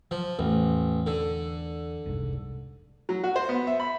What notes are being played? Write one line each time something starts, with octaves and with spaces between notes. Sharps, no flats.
F3 F#3
A1 E2
D3
F1 C2 G#2
F#3
F#4
C5
B3
E5
B5